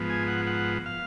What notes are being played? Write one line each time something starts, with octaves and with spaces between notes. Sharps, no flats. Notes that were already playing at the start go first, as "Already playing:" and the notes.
Already playing: G#2 F3 B3
G#5
F#5
F#5
F5